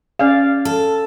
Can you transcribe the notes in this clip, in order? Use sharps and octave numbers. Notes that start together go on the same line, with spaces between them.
C#4 G#4 D5 F5
A4